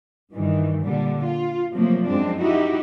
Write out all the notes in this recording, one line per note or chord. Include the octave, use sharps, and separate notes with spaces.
G2 D#3 E3 G3
A#2 D3 G3
F4
C3 F3 F#3 A3 A#3
F#2 G#3 C4 D4
D#4 E4 F#4 G4